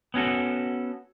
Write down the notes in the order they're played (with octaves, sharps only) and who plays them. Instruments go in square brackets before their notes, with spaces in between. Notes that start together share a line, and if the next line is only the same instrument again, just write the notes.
[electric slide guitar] B3 C#4 F#4 A4